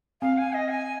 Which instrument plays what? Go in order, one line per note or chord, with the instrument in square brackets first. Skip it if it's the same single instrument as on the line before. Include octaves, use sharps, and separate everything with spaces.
[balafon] C4 [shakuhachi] F5
[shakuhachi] G#5
D#5
G#5